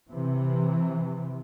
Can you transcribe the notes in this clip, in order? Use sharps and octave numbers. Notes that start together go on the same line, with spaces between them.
C3 E3